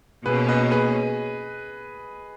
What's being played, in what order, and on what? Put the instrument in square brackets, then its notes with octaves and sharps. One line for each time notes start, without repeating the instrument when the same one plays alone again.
[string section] B2 A#3 C#4 [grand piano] G#4 B4
[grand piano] B4 D#5
G#4 B4